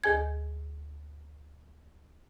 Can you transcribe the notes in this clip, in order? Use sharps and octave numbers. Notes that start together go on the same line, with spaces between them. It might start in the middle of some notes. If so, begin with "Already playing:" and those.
D2 G#4 G#5 G#6